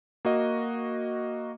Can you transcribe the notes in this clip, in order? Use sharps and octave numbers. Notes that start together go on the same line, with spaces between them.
A#3 F#4 D#5